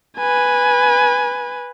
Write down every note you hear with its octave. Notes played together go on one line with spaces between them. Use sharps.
B4 G#5